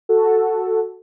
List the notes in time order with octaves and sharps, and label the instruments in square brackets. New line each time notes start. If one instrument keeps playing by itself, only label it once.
[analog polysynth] F#4 A4